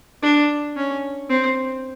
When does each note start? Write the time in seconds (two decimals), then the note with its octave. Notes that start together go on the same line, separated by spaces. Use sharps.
0.23 D4
0.76 C#4
1.29 C4